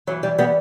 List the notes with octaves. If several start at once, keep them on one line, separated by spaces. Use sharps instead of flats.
G2 E3 F#3
G3
G3 B3